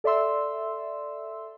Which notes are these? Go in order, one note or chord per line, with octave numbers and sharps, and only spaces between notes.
A4 D5 E5 C6 E6